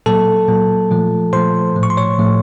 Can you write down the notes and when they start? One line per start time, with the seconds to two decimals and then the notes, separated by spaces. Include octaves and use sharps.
0.06 A#2 F#3 A#3 A4 A5
0.48 A#2 F#3 A#3
0.91 A#2 F3 A3
1.33 A#2 F3 A3 C5 C6
1.76 A2 F3 A3
1.83 C#6
1.90 C6
1.97 C#5 C#6
2.18 A2 F3 A3